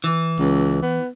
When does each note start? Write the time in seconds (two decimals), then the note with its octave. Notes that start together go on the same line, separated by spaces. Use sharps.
0.04 E3
0.39 C#2
0.82 B3